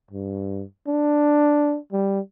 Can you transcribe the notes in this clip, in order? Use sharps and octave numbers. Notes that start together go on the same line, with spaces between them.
G2
D4
G3